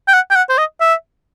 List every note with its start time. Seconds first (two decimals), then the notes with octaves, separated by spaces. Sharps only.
0.08 G5
0.14 F#5
0.31 G5
0.36 F#5
0.49 C5
0.58 D#5
0.81 E5